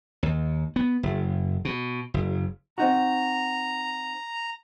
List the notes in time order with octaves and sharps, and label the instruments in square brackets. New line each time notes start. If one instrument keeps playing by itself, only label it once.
[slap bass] D#2
B3
F#1
B2
F#1
[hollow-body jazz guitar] C4 D#4 F#4 [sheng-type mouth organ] A#5